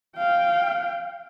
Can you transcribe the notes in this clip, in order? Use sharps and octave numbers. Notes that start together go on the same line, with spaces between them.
F5 G5